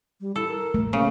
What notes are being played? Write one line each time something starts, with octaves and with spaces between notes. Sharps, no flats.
G3
E4 A4
A#4
A3
C#3 A#3